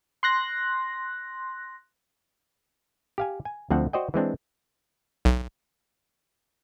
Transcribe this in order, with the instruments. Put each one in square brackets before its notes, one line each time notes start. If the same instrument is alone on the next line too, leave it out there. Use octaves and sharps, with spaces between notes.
[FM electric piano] C6 F#6 A#6
[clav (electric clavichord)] G4 F5 G#5
G#5
D2 F3 C4 A4 F#5
F#4 C5 D5 D#5 G5
E3 G#3 C4 D4
[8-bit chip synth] B1